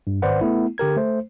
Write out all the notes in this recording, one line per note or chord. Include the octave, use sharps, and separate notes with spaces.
G2
G#1 B4 C5 D5 F#5
A3 B3 E4
D3 G4 A#4 G#6
A3 C5